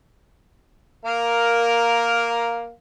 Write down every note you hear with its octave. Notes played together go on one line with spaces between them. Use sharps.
A#3 A#4 F5